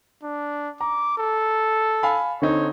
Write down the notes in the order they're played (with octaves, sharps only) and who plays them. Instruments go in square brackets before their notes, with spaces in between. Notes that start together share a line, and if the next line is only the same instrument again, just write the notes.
[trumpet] D4
[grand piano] A#5 [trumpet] D6
[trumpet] A4
[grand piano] F5 G#5 B5
[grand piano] D3 C4 D#4 [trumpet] C#5